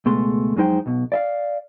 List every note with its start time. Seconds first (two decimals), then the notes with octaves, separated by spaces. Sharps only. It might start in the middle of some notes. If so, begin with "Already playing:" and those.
0.05 C#2 B2 G#3 A3 C6
0.56 F2 F#3 G#3 D#4 C5 G5
0.86 B1 B2
1.12 D5 E5 F5